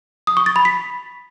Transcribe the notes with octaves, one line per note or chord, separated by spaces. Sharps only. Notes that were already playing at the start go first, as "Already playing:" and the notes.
D#6
C#6
A6
B5
B6